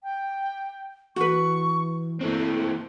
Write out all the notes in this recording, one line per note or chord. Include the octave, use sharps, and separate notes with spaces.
G5
E3 F#4 B4 C#6
E3 A3 A#3 C4